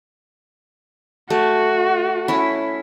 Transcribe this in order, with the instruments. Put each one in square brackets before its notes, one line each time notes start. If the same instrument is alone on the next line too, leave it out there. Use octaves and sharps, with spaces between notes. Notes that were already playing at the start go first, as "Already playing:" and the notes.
[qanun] A3 [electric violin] F#4
[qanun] C#4 E4